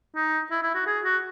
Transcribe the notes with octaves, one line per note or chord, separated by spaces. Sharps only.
D#4
E4
E4
F#4
G#4
F#4